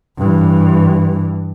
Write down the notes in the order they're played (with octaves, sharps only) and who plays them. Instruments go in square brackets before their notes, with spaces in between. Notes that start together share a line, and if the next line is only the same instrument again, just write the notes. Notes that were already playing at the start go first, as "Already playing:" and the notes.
[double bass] G2 E3